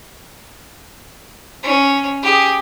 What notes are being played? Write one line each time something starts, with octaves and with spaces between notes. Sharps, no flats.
C#4
G4 G#4